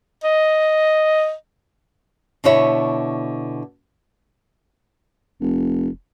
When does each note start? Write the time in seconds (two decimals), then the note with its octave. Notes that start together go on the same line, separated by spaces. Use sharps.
0.24 D#5
2.44 B2 D3 E4 C#5 E5
5.41 F1